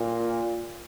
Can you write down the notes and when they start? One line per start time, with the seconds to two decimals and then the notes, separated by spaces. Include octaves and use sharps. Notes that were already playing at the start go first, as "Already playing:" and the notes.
Already playing: A#2